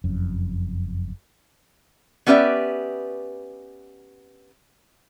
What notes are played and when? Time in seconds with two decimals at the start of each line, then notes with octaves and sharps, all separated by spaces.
0.04 F#1 F2 F#3 C#4
2.27 B3 C#4 G4 B4 D5 E5